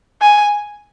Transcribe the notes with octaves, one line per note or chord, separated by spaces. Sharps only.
G#5